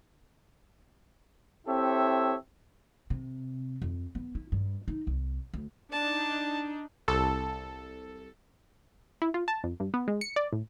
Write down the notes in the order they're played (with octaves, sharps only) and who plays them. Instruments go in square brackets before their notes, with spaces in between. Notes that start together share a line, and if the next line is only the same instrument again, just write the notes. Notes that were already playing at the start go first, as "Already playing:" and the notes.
[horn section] C4 E4 G4 A4 C#5 E5
[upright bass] C3
F2
B3
E4
G2
D#4
C2
D2
[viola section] D4 D#4 [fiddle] A5
[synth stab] C2 A4
E4
F4
A5
F2
G2
B3
G#3
C#7
D5
A2